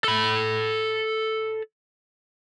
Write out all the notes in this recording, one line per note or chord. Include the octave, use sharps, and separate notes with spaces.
A4 B5